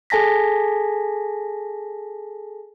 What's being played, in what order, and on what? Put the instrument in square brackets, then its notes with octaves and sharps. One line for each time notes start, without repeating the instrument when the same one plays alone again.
[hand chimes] G#4 A4 G#5 A5 A#6 B6